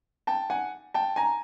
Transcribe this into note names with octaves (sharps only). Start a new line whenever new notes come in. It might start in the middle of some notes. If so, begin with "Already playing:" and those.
G5 A5
F#5 G#5
G5 A5
G#5 A#5